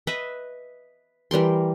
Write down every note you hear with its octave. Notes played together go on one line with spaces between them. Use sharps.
B4 D#5 E5
E3 G3 A#4 C6